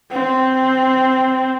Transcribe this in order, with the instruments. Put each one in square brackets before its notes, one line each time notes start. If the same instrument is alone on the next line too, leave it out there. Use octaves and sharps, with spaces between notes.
[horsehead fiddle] C4